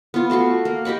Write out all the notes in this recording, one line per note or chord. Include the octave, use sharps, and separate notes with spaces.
B3 F4
A3 F#4 C6 C#6
A#3
G4 D#5 B5 C#6